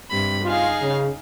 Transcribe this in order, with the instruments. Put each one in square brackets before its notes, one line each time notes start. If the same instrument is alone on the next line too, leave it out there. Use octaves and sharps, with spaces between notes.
[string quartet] G2 C3 B5
[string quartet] D#4 G#4 F5 [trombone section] F4
[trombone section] C#3